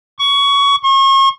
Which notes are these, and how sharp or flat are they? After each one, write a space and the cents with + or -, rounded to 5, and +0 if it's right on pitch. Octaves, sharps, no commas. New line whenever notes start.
C#6 +20
C#6 -40